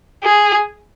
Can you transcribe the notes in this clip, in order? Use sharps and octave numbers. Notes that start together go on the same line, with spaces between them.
G#4